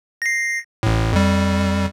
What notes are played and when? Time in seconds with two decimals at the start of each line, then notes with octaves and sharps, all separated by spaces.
0.22 A#6 C7
0.83 A1 A2
1.13 F2 G3